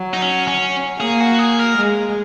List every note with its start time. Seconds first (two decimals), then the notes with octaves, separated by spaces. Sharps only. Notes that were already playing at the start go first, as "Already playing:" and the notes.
Already playing: F#3
0.14 D#4
0.22 C#4
0.48 C#4
1.00 A#3 G#4
1.20 F#4
1.39 G#4
1.59 A#4
1.78 G#3